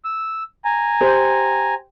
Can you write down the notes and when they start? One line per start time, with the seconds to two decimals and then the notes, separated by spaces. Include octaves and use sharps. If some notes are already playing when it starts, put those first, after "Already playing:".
0.05 E6
0.65 G#5 A#5
1.01 G4 C5